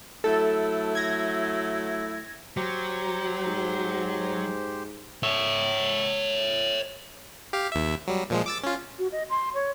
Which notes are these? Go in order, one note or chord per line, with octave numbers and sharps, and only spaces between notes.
F#3 A3 E4 A4
G#6 A#6
F#3 G4 C5
G#2
C#5 E5
G4 F5
D#2 E5
F#3 G3
A#2 F3 G#3
D6 E6 A6
C#4 F4
F#4
D#5
C6
C#5